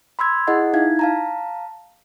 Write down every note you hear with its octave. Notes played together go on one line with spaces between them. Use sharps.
B5 C6 E6 G#6
E4 G#4 D#5 F#5
D#4 E4 F5 G#6
F5 A5 A#5